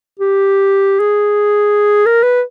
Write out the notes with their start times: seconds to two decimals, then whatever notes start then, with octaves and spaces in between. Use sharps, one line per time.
0.19 G4
1.00 G#4
2.06 A#4
2.23 B4